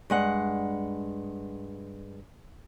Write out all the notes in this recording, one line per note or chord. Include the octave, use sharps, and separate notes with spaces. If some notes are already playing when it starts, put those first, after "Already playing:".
G2 G#3 F#5